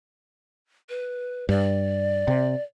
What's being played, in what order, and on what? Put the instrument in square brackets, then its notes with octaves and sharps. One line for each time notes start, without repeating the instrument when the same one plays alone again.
[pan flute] B4
[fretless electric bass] G2 [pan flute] D5
[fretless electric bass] C3